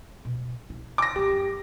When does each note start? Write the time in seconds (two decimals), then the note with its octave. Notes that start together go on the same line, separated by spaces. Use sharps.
0.25 B2
0.70 E4
0.98 D6 A#6
1.16 F#2 D4 G4